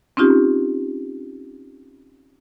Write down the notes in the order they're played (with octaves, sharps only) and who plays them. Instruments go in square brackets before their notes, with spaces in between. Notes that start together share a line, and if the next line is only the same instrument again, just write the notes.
[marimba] C4 C#4 D#4 F4 G4